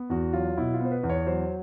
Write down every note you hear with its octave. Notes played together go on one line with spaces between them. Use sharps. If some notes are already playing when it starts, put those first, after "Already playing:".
Already playing: B3
E2 F#4
F#3 F4
B2 E4
F4
B3 C5
B4
E2
C#5
F#3 C5